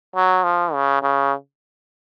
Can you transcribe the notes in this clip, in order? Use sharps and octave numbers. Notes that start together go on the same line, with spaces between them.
F#3
F3
C#3
C#3